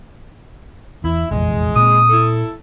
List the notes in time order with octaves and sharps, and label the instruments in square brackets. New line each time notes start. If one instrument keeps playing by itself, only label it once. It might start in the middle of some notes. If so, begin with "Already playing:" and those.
[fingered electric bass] E2 [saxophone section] E4
[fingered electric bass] F1 A#1 E2 [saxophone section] G#3
[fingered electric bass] A#2 A#3 C4 [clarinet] D#6
[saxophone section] E4 A4